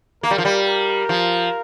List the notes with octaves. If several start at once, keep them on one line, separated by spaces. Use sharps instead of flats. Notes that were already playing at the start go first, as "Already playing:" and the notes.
A#3 A#4
G3
F3
G3
A#4
F3